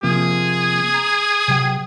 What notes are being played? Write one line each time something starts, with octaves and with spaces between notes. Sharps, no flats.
C3 F3 A#3 G#4
A#5
C3 F#3 G5